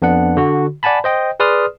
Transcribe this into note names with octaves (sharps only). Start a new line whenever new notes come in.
F2 B3 D4 F#5
D3 F#4
D5 F#5 G#5 A5 B5
C5 D#5 G5
G#4 B4 D5 C6 D#6 F6